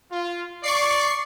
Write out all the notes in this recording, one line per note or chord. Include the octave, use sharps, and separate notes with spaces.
F4
D5 C#6 C7